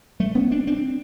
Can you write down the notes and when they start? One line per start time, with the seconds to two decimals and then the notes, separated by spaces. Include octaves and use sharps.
0.20 G3 A3
0.35 B3 C#4
0.51 C4 D4
0.67 C4 D4